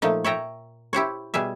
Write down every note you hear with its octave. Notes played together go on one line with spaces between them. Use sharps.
A#2 F3 A3 D#4
C#5 E5 G5 A#5
E4 G4 C5 C#5
B2 G3 G#4 E5